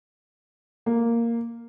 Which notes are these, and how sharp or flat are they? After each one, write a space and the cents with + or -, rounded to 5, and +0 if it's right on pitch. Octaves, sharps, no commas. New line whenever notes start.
A#3 -5